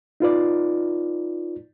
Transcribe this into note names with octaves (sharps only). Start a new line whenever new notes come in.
D#4 F4 B4 D5